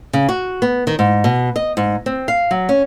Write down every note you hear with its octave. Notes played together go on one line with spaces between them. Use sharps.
C#3
F#4
B3
D#3
G#2
B2
D#5
G#2
C4
F5
F#3
C#4